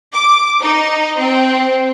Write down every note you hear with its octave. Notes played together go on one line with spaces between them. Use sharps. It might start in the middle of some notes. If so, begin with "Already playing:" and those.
D6
D#4
C4